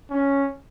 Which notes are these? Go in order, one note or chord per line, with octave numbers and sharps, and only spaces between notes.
C#4